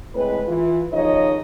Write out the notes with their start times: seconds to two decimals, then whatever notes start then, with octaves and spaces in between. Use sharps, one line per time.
0.14 A2 G#3 C4 B4
0.47 E3 F4
0.92 D#2 C#3 F3 D#4 C#5 D#5